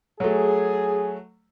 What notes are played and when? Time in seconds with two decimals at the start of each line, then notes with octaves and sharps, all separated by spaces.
0.20 F#3 A3 G#4